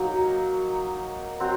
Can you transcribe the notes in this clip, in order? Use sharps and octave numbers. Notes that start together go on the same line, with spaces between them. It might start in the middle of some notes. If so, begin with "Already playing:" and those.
Already playing: F#3 A#3 D#4
F#3 C4 F#4